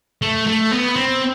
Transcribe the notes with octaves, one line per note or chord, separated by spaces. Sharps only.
A3
A3
B3
C4